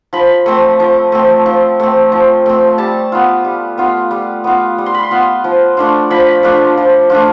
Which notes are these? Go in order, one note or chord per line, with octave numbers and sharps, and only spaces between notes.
F3 B5
A3 C4
F3
A3 C4
F3
A3 C4
F3
A3 C4
G3 A5
B3 F4
G3
B3 F4
G3
B3 F4
G3
C6
B5
C6
B3 F4
F3
A3 D4 F4
F3 B5
A3 D4 F4
F3
A3 D4 F4